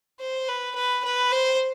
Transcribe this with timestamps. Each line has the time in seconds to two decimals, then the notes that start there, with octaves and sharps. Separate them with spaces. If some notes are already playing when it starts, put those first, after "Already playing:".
0.20 C5
0.48 B4
0.75 B4
1.05 B4
1.32 C5